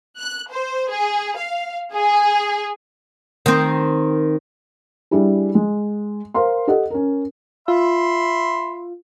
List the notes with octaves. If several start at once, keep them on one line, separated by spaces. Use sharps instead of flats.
F#6
C5
G#4
F5
G#4
D#3 C4
G3 D4 E4 G#4
G#3
A#4 C5 F5 C6
G4 A4 D#5 F#5
C#4 A#4
F4 E5 B5 C6